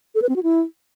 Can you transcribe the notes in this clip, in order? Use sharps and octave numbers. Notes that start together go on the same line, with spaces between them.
A4
B4
C4
F#4
E4